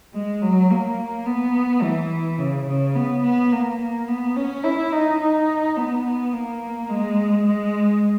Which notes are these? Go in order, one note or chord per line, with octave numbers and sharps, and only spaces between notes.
G#3
F#3
A#3
B3
E3
C#3
C#3
B3
B3
A#3
A#3
B3
C#4
E4
D#4
D#4
B3
A#3
G#3
G#3